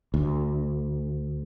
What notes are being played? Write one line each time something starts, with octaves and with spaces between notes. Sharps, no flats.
D2